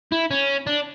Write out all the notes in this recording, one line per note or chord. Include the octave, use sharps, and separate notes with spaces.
E4
C#4
D4